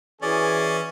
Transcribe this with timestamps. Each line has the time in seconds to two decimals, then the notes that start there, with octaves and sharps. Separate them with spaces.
0.22 E3 C#4 F#4 G#4 D5